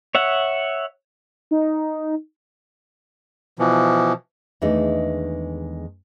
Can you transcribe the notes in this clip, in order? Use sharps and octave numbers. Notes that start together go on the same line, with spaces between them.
C#5 E5 F#5
D#4
B2 E3 F3
E2 D#3 G#3 A3 D4 D#4